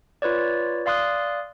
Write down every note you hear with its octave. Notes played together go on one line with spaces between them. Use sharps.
F4 B4 C#5 D5
D5 F5 C6 D#6 F#6